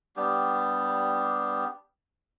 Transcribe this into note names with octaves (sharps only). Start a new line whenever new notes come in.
G3 B3 D4 G4